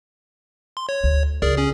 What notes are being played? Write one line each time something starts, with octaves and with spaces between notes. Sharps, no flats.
C6
C#5
D2
C#2 G#4 A#4 D5
C#4 G#4